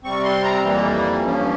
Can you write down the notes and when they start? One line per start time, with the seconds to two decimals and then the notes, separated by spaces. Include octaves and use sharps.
0.04 C3 G3 C4 C#6
0.24 C6
0.43 A#5
0.63 F2 E3 G3 A#3
1.22 G2 F3 A#3 C#4